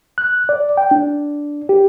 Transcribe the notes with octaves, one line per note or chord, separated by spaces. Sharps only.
F#6
D5
G5
D4
G4